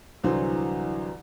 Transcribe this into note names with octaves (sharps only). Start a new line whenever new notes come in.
C2 D3 E3 F#3 C5